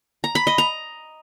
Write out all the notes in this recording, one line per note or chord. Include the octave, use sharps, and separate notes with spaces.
A#5
B5
D#5
A#5